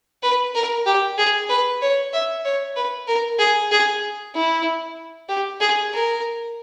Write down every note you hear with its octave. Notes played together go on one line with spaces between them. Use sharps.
B4
A#4
G4
G#4
B4
C#5
E5
C#5
B4
A#4
G#4
G#4
E4
G4
G#4
A#4